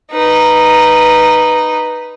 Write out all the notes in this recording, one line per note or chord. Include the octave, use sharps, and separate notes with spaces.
D#4 B4